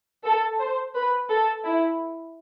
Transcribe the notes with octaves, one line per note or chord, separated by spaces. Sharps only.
A4
C5
B4
A4
E4